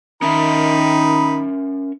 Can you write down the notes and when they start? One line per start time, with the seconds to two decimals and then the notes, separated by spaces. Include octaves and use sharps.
0.22 D#3 C#4 D#4 A#4 E5 B5